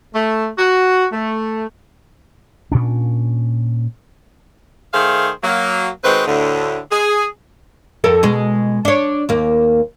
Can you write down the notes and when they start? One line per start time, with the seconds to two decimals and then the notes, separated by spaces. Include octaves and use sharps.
0.14 A3
0.59 F#4
1.11 A3
2.72 A#2 C#4 D4
4.93 D#3 A3 G#4 C5 F5
5.44 F#3 A#3
6.04 D#3 G#3 C4 F#4 B4
6.26 D2 A2 D3
6.92 G#4
8.04 F2 A4 A#4
8.23 B2 G#3
8.85 D4 C#5
9.29 D#2 A#3